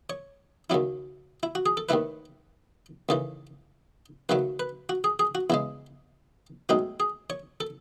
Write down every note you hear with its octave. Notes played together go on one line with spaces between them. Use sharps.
C#5
D#2 C#3 F#3 C#4 E4
E4
F#4
G#4
A4
D#2 D#3 A3 E4 B4
D#2 C#3 E3 A4
D#2 C#3 F#3 A3 B4
B4
F#4
G#4
G#4
F#4
E2 C#3 G#3 E4
B1 A2 G#3 D#4 F#4
G#4
C#5
A4